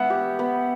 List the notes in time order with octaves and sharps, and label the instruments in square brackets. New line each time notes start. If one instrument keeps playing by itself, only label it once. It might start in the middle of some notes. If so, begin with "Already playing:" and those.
Already playing: [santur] B3 [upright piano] E5 F#5
[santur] G4
B3